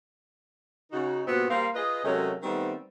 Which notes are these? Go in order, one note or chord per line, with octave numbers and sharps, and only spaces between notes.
C#3 D#4 F#4
G2 A#2 B3 C4 F#4
G3 A#3 A#4 C5 F5
F4 G#4 B4 D#5
C3 F#3 G#3 A3 C#4 A#4
D#3 G3 A3 B3 C4